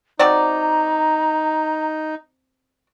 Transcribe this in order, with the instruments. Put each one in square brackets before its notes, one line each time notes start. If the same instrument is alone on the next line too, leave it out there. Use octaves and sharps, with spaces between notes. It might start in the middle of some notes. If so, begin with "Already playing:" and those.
[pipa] C4 F#4 D5 [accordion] D#4 [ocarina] A#5